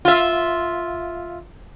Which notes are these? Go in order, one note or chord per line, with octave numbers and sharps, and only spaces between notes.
F4 E5